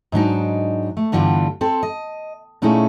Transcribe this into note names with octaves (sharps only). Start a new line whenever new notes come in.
G#2 F#3 D4 D#4
A3
G2 D3 E3 G3 B3 F4
C4 A4 C5
D#5
A#2 A3 C#4 D#4 E4 G#4